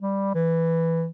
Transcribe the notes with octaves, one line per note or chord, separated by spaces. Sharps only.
G3
E3